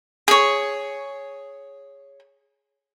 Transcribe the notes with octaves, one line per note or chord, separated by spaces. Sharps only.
G#4 C#5